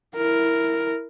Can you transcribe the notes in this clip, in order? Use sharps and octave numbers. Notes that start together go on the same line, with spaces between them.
E4 A#4